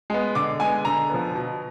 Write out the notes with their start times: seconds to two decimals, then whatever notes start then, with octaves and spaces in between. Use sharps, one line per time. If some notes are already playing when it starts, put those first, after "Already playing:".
0.10 G#3 B3
0.35 D3 D6
0.60 G#3 B3 G#5
0.85 D3 A#5
1.10 F3 B3
1.35 B2